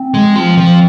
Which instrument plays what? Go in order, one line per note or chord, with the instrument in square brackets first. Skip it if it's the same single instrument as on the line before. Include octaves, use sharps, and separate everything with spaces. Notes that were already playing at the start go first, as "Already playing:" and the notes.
Already playing: [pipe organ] C4
[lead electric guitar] G#3
F3
F3